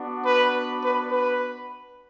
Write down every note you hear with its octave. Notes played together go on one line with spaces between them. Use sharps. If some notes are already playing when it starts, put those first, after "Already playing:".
Already playing: B3 D4 F#4
B4
B4
B4